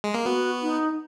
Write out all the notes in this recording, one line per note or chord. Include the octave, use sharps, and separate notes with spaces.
G#3
A#3
B3 F#4
D#4